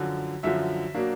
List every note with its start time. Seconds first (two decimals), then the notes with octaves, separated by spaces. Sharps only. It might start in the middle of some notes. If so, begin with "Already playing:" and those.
Already playing: F#2 D3 F3
0.43 F#2 D3 F3 E5
0.95 B2 F#3 A#3 D4